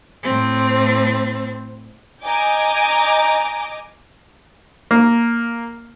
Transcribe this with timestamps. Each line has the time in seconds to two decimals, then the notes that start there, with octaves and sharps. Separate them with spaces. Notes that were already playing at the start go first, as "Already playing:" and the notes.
0.23 A2 C4
2.23 D#5 G#5 A#5 D6 G6
4.91 A#3